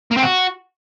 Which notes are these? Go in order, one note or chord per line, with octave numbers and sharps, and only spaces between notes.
A#3
C4
F#4